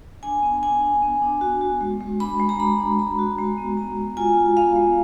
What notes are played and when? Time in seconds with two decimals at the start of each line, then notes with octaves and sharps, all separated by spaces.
0.23 D4 G#5
0.43 B3
0.63 D4 G#5
0.82 D4
1.02 B3
1.22 D4
1.41 F#4
1.61 F#4
1.81 G#3
2.00 G#3
2.20 D4 B5
2.40 G#3
2.49 A#5
2.59 D4 B5
2.79 D4
2.99 G#3 B5
3.19 F#4
3.38 G#3 A#5
3.58 B3
3.77 G#3 A#5
3.97 B3
4.17 F4 G#5
4.37 F4
4.57 B3 F5
4.76 G#3